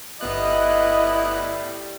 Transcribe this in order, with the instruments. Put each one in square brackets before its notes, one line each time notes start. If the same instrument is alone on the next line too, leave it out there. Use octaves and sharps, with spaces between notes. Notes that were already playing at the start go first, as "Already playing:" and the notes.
[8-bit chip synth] G1 B3 F#6 [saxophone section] A2 G3 [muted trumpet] E4 [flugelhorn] D#5